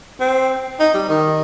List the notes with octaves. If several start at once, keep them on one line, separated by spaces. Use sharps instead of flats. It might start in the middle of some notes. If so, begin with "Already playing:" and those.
C4
D#4
G3
D#3